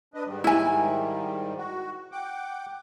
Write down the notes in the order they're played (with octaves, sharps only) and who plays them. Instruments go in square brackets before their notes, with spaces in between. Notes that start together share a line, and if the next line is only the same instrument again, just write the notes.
[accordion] D4 B4 D#5
G#2 D#3 G3
[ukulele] E4 G#5
[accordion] F#4
F#5 G5 D6